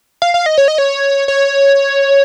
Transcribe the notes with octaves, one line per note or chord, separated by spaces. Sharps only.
F5
F5
D#5
C#5
D#5
C#5
C#5